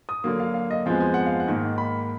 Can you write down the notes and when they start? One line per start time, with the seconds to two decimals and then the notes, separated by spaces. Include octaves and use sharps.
0.09 D#6
0.24 D3 F#3 A#3
0.40 F5
0.54 F5
0.71 D#5
0.86 F2 F3 G#3 B3 F5
1.00 G#5
1.14 F#5
1.26 F5
1.40 F#5
1.47 G#2 D#3 A#3
1.78 B5